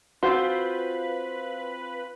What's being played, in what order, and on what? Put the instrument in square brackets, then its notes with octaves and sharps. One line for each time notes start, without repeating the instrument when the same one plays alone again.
[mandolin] C4 F4 C5 [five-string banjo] F#4 [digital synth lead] B4